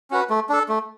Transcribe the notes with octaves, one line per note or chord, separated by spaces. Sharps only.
C#4 F#4 B4
A3
D4 A4
A3